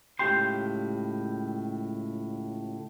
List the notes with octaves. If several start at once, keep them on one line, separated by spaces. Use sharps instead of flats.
C#2 A2 F#4 G4 G5 C6